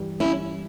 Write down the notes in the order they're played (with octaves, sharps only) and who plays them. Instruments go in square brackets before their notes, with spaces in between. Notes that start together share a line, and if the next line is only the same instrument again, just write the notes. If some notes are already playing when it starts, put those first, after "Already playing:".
Already playing: [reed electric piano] G2 E3 G3
[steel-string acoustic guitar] C#4 E4